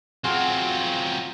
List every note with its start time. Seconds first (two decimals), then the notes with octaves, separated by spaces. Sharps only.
0.24 F#3 C4 F4 G#4 F#5